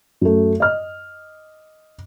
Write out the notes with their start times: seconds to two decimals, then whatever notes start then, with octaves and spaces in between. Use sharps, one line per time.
0.21 F#2 A3
0.60 D#5 F6